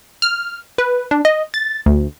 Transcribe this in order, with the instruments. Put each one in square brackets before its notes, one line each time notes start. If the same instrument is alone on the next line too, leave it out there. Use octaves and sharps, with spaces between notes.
[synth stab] F6
B4
D4
D#5
A6
D2